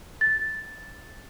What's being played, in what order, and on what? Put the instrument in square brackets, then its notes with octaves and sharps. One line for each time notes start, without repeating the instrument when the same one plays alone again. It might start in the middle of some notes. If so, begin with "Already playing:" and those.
[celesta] A6